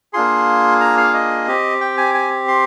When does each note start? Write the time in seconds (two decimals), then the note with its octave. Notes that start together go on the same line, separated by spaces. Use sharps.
0.13 A#3 D4 F4 G#4 C6
0.80 A#5
0.97 F5
1.14 D#5
1.48 C4 G4
1.81 G5
1.98 G#5
2.14 G#5
2.48 C6